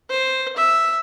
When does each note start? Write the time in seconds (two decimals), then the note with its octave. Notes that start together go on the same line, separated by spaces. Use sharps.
0.10 C5
0.57 E5